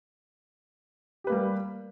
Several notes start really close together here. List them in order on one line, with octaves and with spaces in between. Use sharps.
G4 B4 A#3 G3